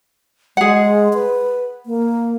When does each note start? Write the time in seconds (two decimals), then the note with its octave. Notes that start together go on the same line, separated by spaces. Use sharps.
0.57 G#3 G#4 F#5
1.14 B4
1.86 A#3